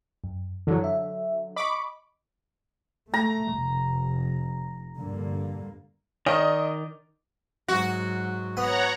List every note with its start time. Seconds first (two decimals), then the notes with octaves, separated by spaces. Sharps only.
0.24 F#2
0.67 F#2 D3 E3 F#3
0.84 E5
1.56 D#5 B5 C#6 D6
3.14 A3 A#5
3.53 F1
4.98 G2 D3 A#3
6.26 D#3 D5 D#5 A#5
7.68 G#2 F#3 F#4
8.57 B3 C#5 F#5 A#5